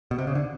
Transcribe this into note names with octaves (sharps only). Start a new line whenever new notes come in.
B2
C3
C#3
D3